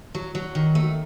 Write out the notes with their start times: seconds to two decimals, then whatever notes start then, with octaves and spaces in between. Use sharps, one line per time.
0.15 F#3
0.35 F#3
0.55 D#3
0.75 A3